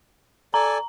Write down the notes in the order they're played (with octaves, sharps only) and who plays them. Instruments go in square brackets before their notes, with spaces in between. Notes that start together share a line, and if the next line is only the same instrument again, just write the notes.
[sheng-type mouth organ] A4 D5 G#5 [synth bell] A#5